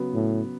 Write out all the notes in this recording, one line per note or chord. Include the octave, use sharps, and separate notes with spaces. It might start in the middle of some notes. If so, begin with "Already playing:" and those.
Already playing: C#3 F#3 B3 F#4 B4
A2